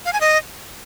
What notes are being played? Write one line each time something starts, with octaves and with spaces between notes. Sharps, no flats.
F5
G#5
D#5